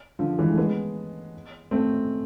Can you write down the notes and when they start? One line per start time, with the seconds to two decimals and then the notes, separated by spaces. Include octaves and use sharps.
0.19 D3 F3
0.38 E3 G#3
0.52 A3
0.58 G#3 B3
1.71 A3 C4